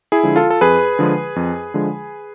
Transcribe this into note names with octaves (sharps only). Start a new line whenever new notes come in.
E4 G#4
D3 F3 G#3
F4 A4
A4
F2 G#4 B4
D3 F3 G#3
F2
D3 F3 G#3